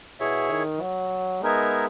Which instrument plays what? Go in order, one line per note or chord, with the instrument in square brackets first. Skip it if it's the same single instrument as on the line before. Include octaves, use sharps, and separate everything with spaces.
[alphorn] B2 [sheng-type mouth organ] E4 G#4 C#5 E5
[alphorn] D#3
F#3
[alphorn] G#3 [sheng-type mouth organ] B3 D#4 A#4 E5 G#5